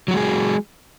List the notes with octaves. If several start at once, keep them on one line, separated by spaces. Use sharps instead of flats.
F#3 G#3 F#4 G#4